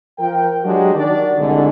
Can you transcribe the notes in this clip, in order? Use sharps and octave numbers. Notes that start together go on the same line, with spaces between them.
F3 A#4 G5
F#3 G#3 D4 F#4 G4
D#3 D4 F#4 D5
C2 G#2 D3